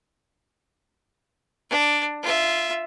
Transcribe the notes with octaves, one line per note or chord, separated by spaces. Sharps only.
D4
F4 E5